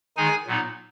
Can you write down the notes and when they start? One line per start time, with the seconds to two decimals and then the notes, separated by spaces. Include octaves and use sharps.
0.17 D#3 G#3 D#4 G#4 G#5
0.46 A#2 F#3 B3 D#4